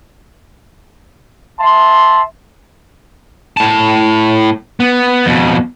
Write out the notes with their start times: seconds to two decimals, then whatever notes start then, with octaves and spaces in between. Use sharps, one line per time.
1.60 E5 A5 C6
3.57 A2 A5
4.80 B3
5.26 F2 B2